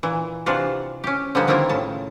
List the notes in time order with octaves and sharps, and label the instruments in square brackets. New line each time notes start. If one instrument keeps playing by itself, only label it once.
[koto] A#2 E3
C3 E3 D4 F4 F#4
C#4 G4
D3 F3 G3 G#3 A#3 B3
D#3 A#3 C4 E4 F4 A#4
A2 C#3 A5